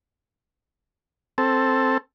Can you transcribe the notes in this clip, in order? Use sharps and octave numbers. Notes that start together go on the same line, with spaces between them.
C4 A4